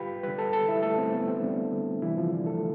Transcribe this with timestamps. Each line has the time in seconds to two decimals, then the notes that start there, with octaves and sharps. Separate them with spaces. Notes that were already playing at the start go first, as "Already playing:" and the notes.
Already playing: D3 G3 F4 G4 B4 F5 G5 B5
0.23 D3 G3 B4 B5
0.38 A4 A5
0.53 A4 A5
0.68 E4 E5
0.83 D3 G3 A3 A4
0.98 C4
1.13 B3
1.28 C4
1.42 D3 G3 D4
2.02 C3 E3 G3 E4
2.17 F3 F4
2.32 D3 D4
2.46 A3 A4